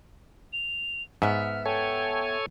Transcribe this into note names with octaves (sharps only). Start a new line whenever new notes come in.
F7
G#2 B3 E5 F6
A4 C#5 G5 G#5